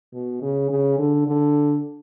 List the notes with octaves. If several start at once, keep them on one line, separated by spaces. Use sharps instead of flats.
B2
C#3
C#3
D3
D3